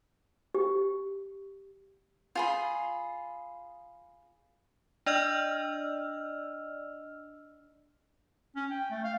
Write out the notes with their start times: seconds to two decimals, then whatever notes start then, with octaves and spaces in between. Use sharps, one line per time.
0.55 G4
2.35 F4 G#4 B5
5.06 D4 D5 D#5 E6 F6
8.56 C#4
8.71 G5
8.91 A3
9.04 F5